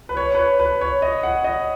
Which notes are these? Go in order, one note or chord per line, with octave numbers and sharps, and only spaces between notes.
B4
C#5
B4
C#5
B4
C#5
D#5
F#5
D#5